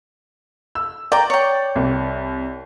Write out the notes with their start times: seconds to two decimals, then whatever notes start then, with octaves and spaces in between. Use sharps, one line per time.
0.75 E6
1.12 D5 G5 A#5
1.30 C#5 G5
1.76 C2